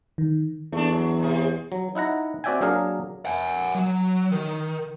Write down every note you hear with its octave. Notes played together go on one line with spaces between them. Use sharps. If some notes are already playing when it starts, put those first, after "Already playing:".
D#3
E2 A3 D4
F#3
C3 G#3
F#3
D#4 E4 F#5 A#5
C4 F#4 D5 E5 G5 G#5
F#3 A#3 D4 G#4 A#4 F5
F#5 G#5
F#3
D#3